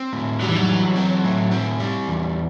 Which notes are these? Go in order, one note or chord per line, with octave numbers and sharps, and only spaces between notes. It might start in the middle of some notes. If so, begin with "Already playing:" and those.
Already playing: C4
A2
F#3 G3
E3
F#3
E3
C4
A2
C4
G3
E2